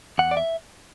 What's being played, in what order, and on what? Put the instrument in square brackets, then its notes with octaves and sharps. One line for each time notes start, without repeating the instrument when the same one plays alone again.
[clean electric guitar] E2 F#5
D5
E5